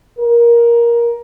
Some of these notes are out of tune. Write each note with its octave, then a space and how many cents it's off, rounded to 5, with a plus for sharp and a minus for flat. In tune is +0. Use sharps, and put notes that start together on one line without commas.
A#4 +15